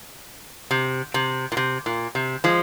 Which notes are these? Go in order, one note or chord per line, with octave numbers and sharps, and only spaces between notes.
C3
C3
A#2
C3
A#2
C3
F3 G#3